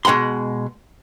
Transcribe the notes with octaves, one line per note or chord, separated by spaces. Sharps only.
B2 G#3 F#5 B5 C6